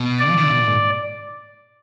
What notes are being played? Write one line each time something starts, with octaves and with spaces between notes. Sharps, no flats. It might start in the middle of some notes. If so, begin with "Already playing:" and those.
Already playing: B2
D5
F3
D#3
D3
B2
A#2
G#2